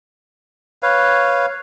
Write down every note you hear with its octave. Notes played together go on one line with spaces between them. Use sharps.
B4 C#5 F5